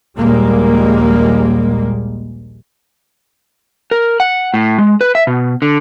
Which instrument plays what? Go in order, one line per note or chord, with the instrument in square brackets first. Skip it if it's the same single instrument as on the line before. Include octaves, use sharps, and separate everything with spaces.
[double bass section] A#1 D#2 A#2 G3 G#3 A#3
[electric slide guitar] A#4
F#5
A2
G#3
B4
E5
B2
D3